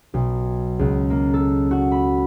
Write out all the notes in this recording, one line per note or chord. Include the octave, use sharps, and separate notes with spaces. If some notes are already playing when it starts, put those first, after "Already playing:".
B1
C#2
A#3
A4
F#4
B5